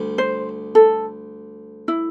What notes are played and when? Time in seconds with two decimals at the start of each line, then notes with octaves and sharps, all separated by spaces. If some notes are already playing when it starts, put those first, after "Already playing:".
Already playing: D2 G3
0.18 C5
0.75 A4
1.88 E4